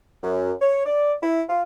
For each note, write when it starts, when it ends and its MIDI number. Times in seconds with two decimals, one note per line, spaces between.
0.22 0.52 42
0.61 0.84 73
0.86 1.13 74
1.22 1.43 64
1.49 1.62 65